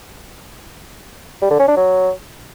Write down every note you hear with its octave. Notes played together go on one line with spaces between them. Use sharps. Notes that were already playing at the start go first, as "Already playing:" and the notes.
G3
D3
C#4
D4
F#3